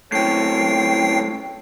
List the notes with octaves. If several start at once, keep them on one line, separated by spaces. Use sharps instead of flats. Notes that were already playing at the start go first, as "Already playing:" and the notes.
F#2 A2 C4 A4 C#5 G5 C7